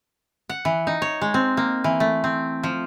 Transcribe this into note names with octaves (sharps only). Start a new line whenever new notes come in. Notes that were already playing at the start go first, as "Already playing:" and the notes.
F#5
E3
D#4
C#5
G#3
C4
A#3
E3
A3
C4
F3